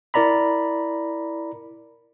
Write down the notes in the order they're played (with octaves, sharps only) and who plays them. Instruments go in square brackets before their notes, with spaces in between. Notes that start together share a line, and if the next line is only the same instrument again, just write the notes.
[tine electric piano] E4 A#4 D5 A#5 B5